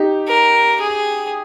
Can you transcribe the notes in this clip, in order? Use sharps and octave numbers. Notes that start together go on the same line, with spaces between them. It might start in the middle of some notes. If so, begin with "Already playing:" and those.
Already playing: D#4 G4
A#4
G#4